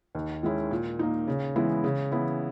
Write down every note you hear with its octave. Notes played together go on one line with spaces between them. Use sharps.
D#2
D#3 G#3 C#4 E4
A#2
A#3 D#4
C#3
E3 G#3 B3 E4
C#3
E3 B3 E4